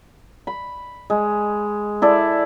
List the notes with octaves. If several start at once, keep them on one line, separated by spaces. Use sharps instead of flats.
B5
G#3
E4 A4 D5